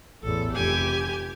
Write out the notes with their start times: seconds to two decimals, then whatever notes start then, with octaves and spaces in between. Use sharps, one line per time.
0.23 A1 E2 A4
0.52 F1 G4 G#5